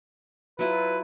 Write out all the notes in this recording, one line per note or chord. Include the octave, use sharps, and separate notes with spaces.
F#3 E4 F4 B4